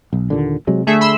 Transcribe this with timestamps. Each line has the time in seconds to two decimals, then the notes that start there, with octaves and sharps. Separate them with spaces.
0.13 B1
0.30 D#2 A#2 D3
0.67 C3 F#3 G#3
0.87 D3 A3 G#4 E5
1.01 B5 C6 E6